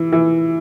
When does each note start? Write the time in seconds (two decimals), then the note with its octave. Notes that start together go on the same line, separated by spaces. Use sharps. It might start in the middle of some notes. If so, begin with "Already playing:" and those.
Already playing: E3
0.12 E3